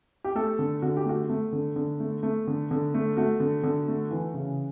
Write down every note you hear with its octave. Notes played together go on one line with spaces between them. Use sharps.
G4
A3 A4
D3
D3 F#4
G4
A3 F#4
A3
D3
D3
A3
A3
D3
D3
A3
A3 F#4
D3
D3
A3
E3
C#3